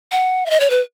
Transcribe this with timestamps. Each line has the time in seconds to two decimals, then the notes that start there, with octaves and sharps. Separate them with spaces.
0.12 F#5
0.46 E5
0.50 D#5
0.60 C#5
0.70 B4